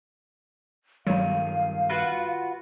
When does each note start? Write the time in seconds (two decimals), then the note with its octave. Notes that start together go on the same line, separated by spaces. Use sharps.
1.07 G2 D#3 F#3 G3 F5
1.89 F4 F#4 B4